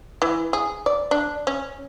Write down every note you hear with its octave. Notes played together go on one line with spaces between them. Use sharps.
E3
G#4
D5
D4
C#4